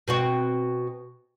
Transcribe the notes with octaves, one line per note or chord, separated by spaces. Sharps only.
B2 C4 F#4